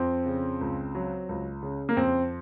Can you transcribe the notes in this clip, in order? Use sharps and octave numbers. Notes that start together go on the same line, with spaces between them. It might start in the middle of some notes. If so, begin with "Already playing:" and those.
Already playing: F2 F3 C4
C#3
C#2
F#3
C#2
C#3
A#3
F2 C4